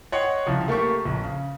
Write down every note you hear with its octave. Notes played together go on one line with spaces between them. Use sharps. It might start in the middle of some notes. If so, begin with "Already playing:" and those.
C#5 D#5 F#5 G5 C6 C#7
C2 C#3 F3
A3 A#3 G4 E5 C#6
A#1
C#3